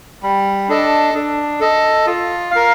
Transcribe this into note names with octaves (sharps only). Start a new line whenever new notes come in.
G3
D4 A4 D#5
D4
A4 D#5
F4
A#4 F5